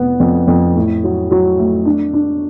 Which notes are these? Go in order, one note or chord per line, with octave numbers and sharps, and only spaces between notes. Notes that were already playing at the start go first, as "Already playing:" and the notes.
Already playing: F1 B3
F2
F2
A2
F#3
F#3
A3
D4
D4